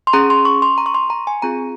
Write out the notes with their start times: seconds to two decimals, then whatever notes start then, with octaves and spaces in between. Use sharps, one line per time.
0.07 C6
0.13 C#4 G#4 A#5
0.30 C6
0.45 C#6
0.62 C6
0.78 A#5
0.86 C#6
0.94 C6
1.10 A#5
1.27 G#5
1.42 C4 F4 G#4 A#5